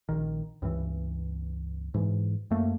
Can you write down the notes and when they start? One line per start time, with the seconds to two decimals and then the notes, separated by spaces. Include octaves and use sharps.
0.09 A#1 D#3
0.62 C#2 G2 E3
1.94 G#2 E3
2.51 F#2 A3 A#3